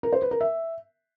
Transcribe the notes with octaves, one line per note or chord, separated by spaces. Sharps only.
A#4
C5
B4
A#4
E5